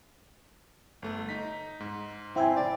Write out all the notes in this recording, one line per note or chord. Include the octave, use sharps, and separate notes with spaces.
G1 A3
D#4 B6
G#2
C4 E4 G#5
D5